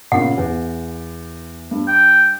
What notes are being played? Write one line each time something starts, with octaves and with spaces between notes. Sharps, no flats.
A#2 C#3 F#5
E2
G2
G5